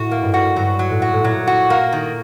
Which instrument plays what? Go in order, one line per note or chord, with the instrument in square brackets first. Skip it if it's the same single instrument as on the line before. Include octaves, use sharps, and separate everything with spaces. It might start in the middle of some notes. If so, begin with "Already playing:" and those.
Already playing: [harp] A2 [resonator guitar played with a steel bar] F#4
[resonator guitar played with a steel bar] A#3
[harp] G2
[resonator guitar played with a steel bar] F#4
[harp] G2 [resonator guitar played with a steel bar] F#3
[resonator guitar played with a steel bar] F#3
[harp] A2
[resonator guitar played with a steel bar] F#4
[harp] A2
[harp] A#2 [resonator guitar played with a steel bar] F#3
[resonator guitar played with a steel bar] F#4
A#3
D#3